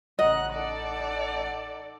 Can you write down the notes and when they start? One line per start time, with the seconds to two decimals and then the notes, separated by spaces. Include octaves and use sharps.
0.19 A1 C#3 D#5 F#5 A#5 F#6
0.50 D#4 A4 D5